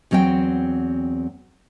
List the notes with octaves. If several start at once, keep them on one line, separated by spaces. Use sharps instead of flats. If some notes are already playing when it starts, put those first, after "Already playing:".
E2 F#3 C4 D#5 G5